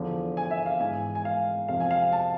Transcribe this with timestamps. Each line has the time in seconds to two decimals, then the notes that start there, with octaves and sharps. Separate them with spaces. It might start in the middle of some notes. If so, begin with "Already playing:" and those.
Already playing: E2 D3 F3
0.37 G#5
0.51 E5
0.66 F5
0.81 G#2 E3 G#5
1.15 G#5
1.25 F5
1.68 F2 C3 F3 F5
1.80 G#5
1.91 F5
2.13 A5